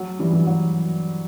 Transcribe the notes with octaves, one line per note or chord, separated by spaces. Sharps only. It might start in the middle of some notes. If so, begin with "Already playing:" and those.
Already playing: F#3
E3 G3
E3
F#3